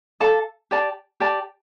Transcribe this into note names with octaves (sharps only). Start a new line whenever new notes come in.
A4 D5 F5 A5
G4 D5 A5
G4 D5 A5